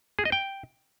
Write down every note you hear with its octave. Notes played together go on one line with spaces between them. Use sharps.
G#4
D#5
G5